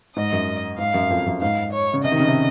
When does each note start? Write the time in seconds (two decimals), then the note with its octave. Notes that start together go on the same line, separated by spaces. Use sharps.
0.16 G#2 D#5
0.32 F#2
0.78 G#2 F5
0.94 F#2
1.10 F2
1.26 F#2
1.41 G#2 F5
1.73 C#5
1.93 C#3
2.04 C3 D#5
2.12 D#3
2.20 C#3
2.27 C3